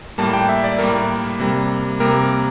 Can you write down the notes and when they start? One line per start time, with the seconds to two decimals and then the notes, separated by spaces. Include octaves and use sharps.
0.18 A2 G3 A#3 A5
0.33 G5
0.49 E5
0.64 D5
0.79 A2 G3 A#3 A#4
1.40 C3 G3 A#3
2.00 C3 G3 A#3 A#4